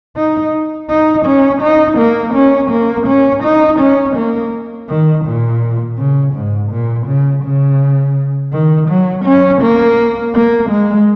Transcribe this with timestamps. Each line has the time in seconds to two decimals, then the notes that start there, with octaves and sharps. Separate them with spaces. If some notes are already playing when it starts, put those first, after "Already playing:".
0.17 D#4
0.90 D#4
1.26 C#4
1.62 D#4
1.98 A#3
2.34 C#4
2.71 A#3
3.07 C#4
3.44 D#4
3.80 C#4
4.16 A#3
4.89 D#3
5.26 A#2
5.98 C#3
6.34 G#2
6.71 A#2
7.07 C#3
7.44 C#3
8.53 D#3
8.89 F#3
9.25 C#4
9.62 A#3
10.34 A#3
10.70 G#3